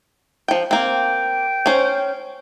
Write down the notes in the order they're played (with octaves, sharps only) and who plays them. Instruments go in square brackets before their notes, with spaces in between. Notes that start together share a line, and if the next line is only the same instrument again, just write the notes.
[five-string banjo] F3 G5
[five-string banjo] A#3 C4 [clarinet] G5
[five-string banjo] C#4 C5